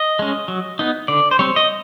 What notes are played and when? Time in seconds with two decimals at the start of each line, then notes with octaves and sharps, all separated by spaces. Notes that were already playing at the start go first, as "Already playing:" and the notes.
Already playing: D#5
0.19 G#3 C#4
0.48 F#3
0.79 B3 D#4
1.08 D3 D5
1.31 C5
1.39 G3 C4 C#5
1.56 D#5